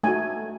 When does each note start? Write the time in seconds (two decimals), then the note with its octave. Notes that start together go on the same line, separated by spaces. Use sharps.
0.03 A3 D#4 F#4 G#5